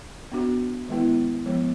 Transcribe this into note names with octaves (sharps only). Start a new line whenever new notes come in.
B3 D4 F#4
D#3 G#3 B3 E4
F3 G#3 B3